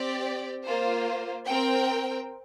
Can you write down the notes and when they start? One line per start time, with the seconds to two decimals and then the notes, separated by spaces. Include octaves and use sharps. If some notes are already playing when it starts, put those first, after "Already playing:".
Already playing: C4 G4 D5 G5
0.64 A#3 F4 C5
1.46 C4 A#4 G5